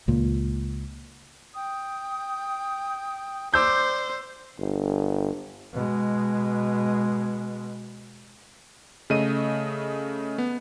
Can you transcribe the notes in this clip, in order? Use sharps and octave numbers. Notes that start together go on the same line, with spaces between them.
C#2 A#2
G5 D#6
C5 D5 D6 E6 G6
G1
B2 G#3
C#3 A3 D#5 D#7
B3